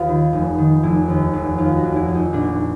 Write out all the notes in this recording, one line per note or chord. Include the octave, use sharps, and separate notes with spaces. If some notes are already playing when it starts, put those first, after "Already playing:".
Already playing: D#2 F4 B4
D#3
F1
D#3
F1 E4
D#2
F1
D#2 F4
F#4
F1
E4
F1
D#4
A#1 D4